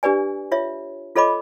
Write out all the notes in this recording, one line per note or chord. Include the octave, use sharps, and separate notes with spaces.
D4 G4 B4 D5 G#5
F4 C#5 E5
F4 A4 C#5 D#5 B5 D6